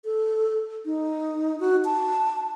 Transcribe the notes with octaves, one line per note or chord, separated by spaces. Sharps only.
A4
D#4
F#4
A5